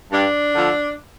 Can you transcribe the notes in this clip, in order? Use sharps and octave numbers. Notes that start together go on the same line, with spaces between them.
G2 D4
D3 F3 A3